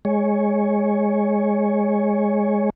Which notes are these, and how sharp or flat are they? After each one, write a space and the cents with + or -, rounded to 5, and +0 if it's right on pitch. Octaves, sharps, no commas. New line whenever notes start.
G#3 +0 C#5 +0